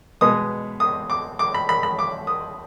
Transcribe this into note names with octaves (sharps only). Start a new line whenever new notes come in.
B2 G#3 B3 D#6
D#6
D6
D6
B5
B5
B5
D6
D#6